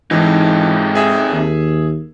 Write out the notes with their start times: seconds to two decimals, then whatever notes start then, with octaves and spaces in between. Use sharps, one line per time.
0.11 G#2 C3 E3 D#4
0.95 G#4 E5
1.32 D#2